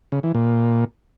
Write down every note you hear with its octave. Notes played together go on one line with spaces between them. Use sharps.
C#3
E3
A#2